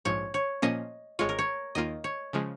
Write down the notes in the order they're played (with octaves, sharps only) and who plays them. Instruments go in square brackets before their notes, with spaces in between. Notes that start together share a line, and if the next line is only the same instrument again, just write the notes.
[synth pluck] A#1 G#2 F3 [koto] C#5
[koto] C#5
[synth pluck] A#2 F3 A#3 C#4 [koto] D#5
[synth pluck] G#1 G#2 G#3 F4 [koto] C#5
[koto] A#4
C#5
[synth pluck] D#2 D#3 A#3 F4 [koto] D#5
[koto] C#5
[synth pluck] C#3 F3 G#3